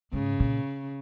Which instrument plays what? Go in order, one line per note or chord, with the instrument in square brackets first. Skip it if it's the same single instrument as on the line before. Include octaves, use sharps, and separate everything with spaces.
[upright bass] G#2 [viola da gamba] C#3
[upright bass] A#2